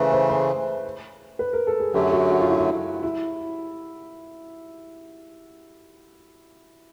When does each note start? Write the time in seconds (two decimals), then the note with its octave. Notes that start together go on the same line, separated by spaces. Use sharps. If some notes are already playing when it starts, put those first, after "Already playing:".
Already playing: C#3 E3 A3 B4 C5
0.12 C5
0.30 C5
1.39 B4
1.53 A#4
1.67 A4
1.80 G#4
1.94 F#2 D3 F#3 A3 G4
2.12 F#4
2.31 F#4
2.40 F4
2.49 E4
2.58 F4
3.03 E4